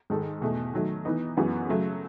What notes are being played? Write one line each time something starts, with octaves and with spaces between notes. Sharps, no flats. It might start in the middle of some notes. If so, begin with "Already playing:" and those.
G#2 D#3 G#3 D#4 A4
E2 B2 A3
D#3 F#3 A3
E3 B3 D#4
F#2 E3 G#3 B3 F#4
C#3 F#3 A3